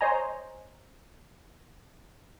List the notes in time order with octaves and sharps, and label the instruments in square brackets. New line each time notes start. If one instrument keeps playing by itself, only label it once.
[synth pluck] C5 C#5 D#5 G#5 A#5